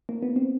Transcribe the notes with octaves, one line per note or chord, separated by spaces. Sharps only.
A#3
B3
C4